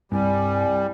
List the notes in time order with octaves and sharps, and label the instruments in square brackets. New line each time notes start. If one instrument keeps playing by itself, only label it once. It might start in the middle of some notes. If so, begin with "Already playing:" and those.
[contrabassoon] C2 [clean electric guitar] G2 [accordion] G3 [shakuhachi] G#5